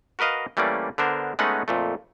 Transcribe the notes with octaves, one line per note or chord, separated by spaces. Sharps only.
F#4 A#4 B4 D#5 F5
E3 G3 A3 A#3 C#4 D5
D3 B3 D4 A#4 C5
G#3 A3 B3 C#4 D#4 F#5
F2 A#2 A3